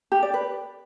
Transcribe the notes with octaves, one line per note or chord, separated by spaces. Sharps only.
G4
D5
B4